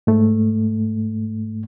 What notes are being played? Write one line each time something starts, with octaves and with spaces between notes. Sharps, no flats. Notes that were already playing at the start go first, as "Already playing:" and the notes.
G#2 A3